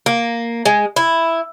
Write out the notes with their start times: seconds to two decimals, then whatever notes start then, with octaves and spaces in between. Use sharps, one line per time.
0.06 A#3
0.65 G#3
0.96 E4